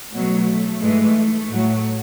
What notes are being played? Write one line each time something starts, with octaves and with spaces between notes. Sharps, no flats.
B2 F#3 A3
G#2 E3 G#3
A2 F#3